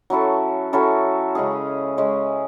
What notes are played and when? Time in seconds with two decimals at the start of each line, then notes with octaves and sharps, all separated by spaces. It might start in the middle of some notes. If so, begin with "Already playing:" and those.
0.10 F#3 C#4 E4 A4
0.73 F#3 C#4 E4 A4
1.35 C#3 G#3 C#4 G#4
1.98 C#3 G#3 C#4 G#4